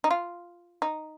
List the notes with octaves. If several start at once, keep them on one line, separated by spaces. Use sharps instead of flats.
D#4
F4
D#4